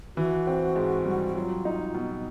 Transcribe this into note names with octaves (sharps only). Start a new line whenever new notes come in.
E3 F#4
C4
G#2
G3
F#3 F4
D#4
B2